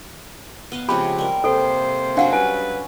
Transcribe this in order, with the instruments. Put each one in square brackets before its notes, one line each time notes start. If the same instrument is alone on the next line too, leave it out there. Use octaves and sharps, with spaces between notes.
[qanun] B3 D#5 F5
[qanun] C#3 C4 F#4 [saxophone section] F3 G#3 G4 [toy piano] B5
[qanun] G3 A#4
[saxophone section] C3 A#3 C5 [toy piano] A4
[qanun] F#3 C#4 F#4 [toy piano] D4 F5 F#5
[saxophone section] G3 B4 [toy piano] G#5